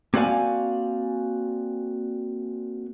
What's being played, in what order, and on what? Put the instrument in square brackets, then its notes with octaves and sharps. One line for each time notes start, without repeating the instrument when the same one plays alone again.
[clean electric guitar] A#3 C4 F#4 D5 F5 G#5